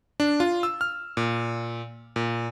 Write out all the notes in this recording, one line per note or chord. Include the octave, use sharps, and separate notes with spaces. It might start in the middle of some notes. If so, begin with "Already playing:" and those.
D4
F4
E6
F6
A#2
A#2